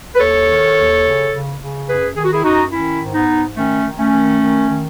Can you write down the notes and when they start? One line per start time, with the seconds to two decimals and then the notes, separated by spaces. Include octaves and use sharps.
0.15 B4
0.19 D#2 A4 C#5
0.47 D#3
0.76 D#2
1.04 C#3
1.32 C#3
1.60 C#3
1.88 F#2 G#4 B4
2.16 D#3 G#4
2.25 F#4
2.33 E4 G#4
2.44 F#2 D#4 F#4
2.72 D#3 C#4 E4
3.00 G#2
3.14 B3 D#4
3.29 G#2
3.56 D#3 A3 C#4
3.85 D#3
3.99 A3 C#4
4.13 D#3
4.41 D#3
4.70 D#3